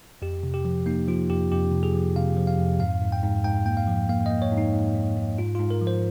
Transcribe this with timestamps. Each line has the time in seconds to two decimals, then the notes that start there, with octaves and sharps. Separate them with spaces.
0.22 F2 G4
0.44 C3
0.54 G4
0.65 F3
0.86 A#3 D#4
1.08 F3 F4
1.29 F2 G4
1.52 F2 G4
1.72 C3
1.83 G#4
1.94 F3
2.16 C3 F5
2.37 F3
2.47 F5
2.59 F2
2.80 G#2 F5
3.02 G#2
3.12 G5
3.23 G#2
3.44 G#2 G5
3.66 A#3 G5
3.77 F5
3.88 F3
4.09 A#3 F5
4.26 A#3 D#5
4.42 C#5
4.52 G#2
4.58 D#4
4.73 G#2
4.95 G#2
5.17 G#2
5.38 G#2 F4
5.55 G#2 F4
5.71 A#4
5.81 F3
5.87 C5